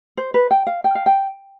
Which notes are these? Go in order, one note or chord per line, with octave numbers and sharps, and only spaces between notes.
C5
B4
G5
F5
G5
F5
G5